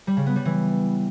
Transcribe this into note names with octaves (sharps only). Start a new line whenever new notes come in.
G3
C#3
B3
G3
E3